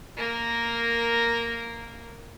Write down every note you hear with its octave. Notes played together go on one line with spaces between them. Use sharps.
A#3 A#4